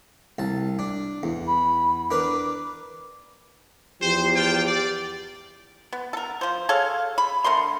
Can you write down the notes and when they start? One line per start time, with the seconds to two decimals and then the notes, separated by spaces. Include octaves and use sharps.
0.39 C2 A5
0.79 D4
1.23 E2
1.47 B5
2.11 D4 A#4 B4 D6
4.02 E2 F3 G4 C5
4.36 F4 G5
4.66 D5
5.93 B3
6.13 A4 A#4
6.41 F3 C5
6.69 G#4 A4 C#5 F5
7.18 B5
7.44 D3 A3 A#4 C6